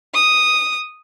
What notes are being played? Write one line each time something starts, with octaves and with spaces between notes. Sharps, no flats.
D#6